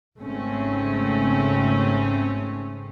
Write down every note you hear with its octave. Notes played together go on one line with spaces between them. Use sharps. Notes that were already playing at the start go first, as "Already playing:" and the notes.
G#1 C#3 A3 C4 C#4